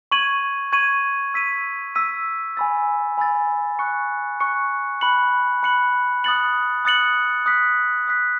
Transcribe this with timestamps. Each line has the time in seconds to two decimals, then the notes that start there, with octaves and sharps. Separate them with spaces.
0.12 C#6 G#6 D#7 F#7
0.72 C#6 G#6 D#7 F#7
1.34 E6 B6 D#7
1.95 E6 B6 D#7
2.57 G#5 B5 E6 A6
3.18 G#5 B5 E6 A6
3.79 C#6 F#6 C#7
4.40 C#6 F#6 C#7
5.01 B5 F#6 C#7 F#7
5.63 B5 F#6 C#7 F#7
6.24 D#6 F#6 A6 C#7 F#7
6.85 D#6 F#6 A6 C#7 F#7
7.46 D#6 F#6 B6
8.07 D#6 F#6 B6